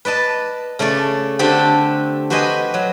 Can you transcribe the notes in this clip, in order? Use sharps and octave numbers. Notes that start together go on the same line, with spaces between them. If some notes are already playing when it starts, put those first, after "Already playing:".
B4 D5 D#5 A5
C#3 A3 C#5 D5
D3 A3 C4 D4 G4 A4
F#4 G4 B4 C5 D#5 G#5
F#3